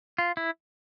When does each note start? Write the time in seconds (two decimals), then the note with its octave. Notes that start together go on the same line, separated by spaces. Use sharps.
0.18 F4
0.37 E4